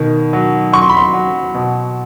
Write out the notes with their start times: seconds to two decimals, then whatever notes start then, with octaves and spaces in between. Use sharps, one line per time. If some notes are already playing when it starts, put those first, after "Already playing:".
Already playing: B2 D#3
0.33 F#3
0.73 F#3 C#6
0.82 C6
0.89 B5
0.97 C6
1.13 F#3
1.54 B2